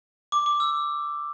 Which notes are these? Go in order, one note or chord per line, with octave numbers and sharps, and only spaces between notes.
D6
D6
E6